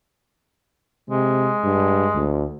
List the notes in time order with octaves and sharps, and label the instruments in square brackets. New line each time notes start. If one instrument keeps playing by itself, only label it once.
[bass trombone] C3 [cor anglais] G#3
[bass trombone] G2
D2